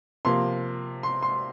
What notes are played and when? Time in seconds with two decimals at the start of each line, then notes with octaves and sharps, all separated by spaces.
0.25 C3 F3 A#3 C6
1.03 C6
1.22 C6